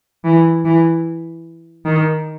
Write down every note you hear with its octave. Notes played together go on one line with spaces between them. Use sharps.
E3
E3
D#3